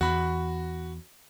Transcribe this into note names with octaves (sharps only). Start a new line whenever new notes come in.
E2 F#4 B5